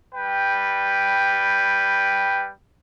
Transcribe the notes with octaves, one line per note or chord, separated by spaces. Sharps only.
G3 B4 G5